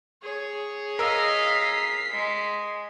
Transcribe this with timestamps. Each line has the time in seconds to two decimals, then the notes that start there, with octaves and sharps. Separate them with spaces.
0.22 G#4 C#5
0.99 A#4 D#5 F5 E6 B6 C7
2.12 G#3